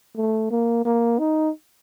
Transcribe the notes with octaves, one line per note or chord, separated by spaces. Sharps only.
A3
A#3
A#3
D#4